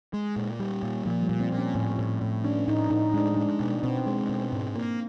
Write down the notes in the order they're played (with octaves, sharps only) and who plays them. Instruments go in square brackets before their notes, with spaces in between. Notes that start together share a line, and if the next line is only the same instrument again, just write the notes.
[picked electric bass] G#3
A#2
G3
A#2
[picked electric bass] A#2 [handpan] F3
[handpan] G3
[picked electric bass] A#2
[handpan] C4
[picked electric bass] A#2
[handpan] C#4
[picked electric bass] A2
A2
A2
[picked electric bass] C#4 [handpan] D4
[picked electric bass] A2 [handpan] D#4
[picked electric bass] A2 [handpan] D#4
[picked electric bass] G#3 [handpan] D4
[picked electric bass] G#3 [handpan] D4
[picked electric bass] B2
[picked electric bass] B2 [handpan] C4
[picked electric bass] G#3
B2
G#2
A#3